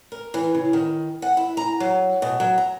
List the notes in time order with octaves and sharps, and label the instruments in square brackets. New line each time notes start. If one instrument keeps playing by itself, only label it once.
[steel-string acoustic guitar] A#4
E3
C#3
D#3
F#5
E4
A#5
F#3
B2
F#3
A#5